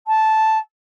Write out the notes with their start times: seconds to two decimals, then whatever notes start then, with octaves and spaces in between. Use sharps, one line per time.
0.07 A5